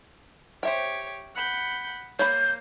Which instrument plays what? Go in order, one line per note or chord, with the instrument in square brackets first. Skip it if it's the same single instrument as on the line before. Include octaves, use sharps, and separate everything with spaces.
[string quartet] G4 C#5 [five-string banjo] C5 E5 G5
[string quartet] F#5 B5 G6
[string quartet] A#3 [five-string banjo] C#5 B5 [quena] G6